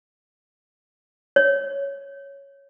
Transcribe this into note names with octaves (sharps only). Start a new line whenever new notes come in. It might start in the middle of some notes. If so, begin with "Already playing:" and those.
C#5